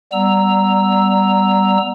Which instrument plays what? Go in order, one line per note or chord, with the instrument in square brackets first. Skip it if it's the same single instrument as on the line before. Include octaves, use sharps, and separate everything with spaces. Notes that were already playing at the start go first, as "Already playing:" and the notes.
[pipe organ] G3 B3 A#5 E6